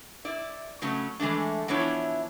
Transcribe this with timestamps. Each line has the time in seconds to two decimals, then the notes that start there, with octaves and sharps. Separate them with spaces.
0.25 E4 D5
0.81 C#3 F#3 A3 C#4
1.19 E3 G#3 A3 D4
1.68 E3 F3 B3 D4 E4 C#5